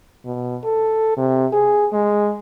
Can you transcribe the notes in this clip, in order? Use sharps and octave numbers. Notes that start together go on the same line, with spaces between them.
B2
A4
C3
G#4
G#3